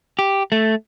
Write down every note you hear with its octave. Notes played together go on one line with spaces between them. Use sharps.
G4
A3